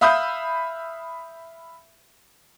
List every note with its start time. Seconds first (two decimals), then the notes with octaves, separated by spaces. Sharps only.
0.01 E5 F5 B5 D#6 E6 G6